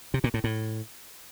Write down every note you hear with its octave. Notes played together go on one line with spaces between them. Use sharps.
C3
A#2
A2
A2